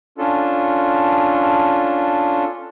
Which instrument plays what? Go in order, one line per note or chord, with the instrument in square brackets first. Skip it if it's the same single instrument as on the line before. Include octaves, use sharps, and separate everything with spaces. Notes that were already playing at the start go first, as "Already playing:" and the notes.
[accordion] C#4 D4 F4 A4